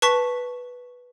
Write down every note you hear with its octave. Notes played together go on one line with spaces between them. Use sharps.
B4 A5 C#6 B6